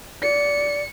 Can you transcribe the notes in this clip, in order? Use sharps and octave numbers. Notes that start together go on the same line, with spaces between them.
D5 C#7